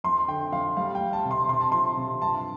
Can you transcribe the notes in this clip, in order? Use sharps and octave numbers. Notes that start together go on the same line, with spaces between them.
F2 C6
D3 G5
F2 F5
G3 F5
G5
G3
A5
C3
C6
C3 C6
A5
F3 C6
C3
G2 A5